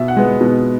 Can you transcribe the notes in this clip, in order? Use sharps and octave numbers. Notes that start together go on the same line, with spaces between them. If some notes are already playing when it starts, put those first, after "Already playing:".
Already playing: B2 E5
F#5
G#3 B3
B2